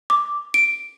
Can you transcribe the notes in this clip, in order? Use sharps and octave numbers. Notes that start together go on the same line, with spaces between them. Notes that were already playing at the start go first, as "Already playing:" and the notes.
D6
D7